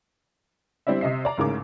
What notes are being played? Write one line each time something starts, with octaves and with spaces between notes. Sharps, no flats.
G3 C4 D4 E4 E5
C3 D#5 E5 C7
D5 A#5
A1 G#2 C#3 A#4 D6